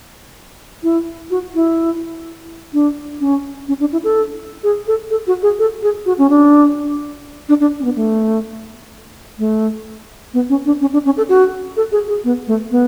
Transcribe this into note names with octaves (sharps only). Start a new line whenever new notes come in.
E4
F#4
E4
D4
C#4
C#4
D4
E4
A4
G#4
A4
A4
F#4
G#4
A4
G#4
F#4
C#4
D4
D4
D4
C#4
B3
A3
A3
B3
C#4
D4
C#4
D4
C#4
A4
F#4
A4
G#4
G#4
B3
A3
B3